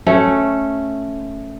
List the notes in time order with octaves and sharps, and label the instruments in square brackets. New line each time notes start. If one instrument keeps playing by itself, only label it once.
[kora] A3 C#4